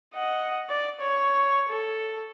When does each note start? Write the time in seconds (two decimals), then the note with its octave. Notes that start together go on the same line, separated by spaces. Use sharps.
0.15 D#5 F#5
0.70 D5
1.01 C#5 C#6
1.69 A4